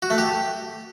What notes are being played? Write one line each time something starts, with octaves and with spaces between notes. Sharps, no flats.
F#4
A3
G4